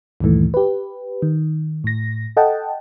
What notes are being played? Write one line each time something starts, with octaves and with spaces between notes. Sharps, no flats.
D2 G2 A#2 D#3 E3 A3
G4 B4
D#3
A2 A#6
A4 D#5 F#5 G5 A5